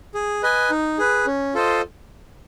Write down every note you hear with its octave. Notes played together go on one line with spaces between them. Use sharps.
G#4
B4 D#5 G#5
D#4
G#4 B4
C#4
F4 A4 C5 D#5